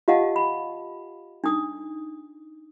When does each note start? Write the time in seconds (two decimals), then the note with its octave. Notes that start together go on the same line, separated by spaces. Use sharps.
0.08 F4 G4 D#5 F5 F#5 A5
0.36 B5
1.44 D4 D#4 D#6